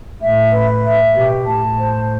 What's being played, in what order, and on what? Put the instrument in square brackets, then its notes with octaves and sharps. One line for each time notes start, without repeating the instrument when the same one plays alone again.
[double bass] A2 [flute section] E5
[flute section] B4
E5
[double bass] B2 [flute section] G4
[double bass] A2 [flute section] A5
[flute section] C5